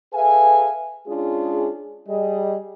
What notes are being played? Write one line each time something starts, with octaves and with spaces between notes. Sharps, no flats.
G#4 A4 B4 E5 F5 G#5
G#3 C#4 D4 F4 G#4
G3 G#4 D#5